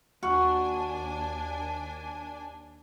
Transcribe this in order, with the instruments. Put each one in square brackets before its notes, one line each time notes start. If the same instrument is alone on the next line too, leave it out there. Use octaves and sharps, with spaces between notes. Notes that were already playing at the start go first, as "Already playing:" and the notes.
[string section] D#2 D4 G#5 [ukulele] F#4